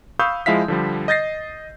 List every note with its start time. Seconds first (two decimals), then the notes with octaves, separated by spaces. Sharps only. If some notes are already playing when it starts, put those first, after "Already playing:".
0.19 F5 B5 C#6 D#6 E6 G6
0.46 F3 G#3 E4 E5 F5 B6
0.68 D3 F3 G3
1.08 D#5 G6 A6 A#6 C7